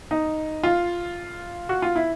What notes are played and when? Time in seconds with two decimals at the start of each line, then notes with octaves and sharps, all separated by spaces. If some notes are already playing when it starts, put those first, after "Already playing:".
0.11 D#4
0.63 F4
1.69 F#4
1.82 F4
1.96 E4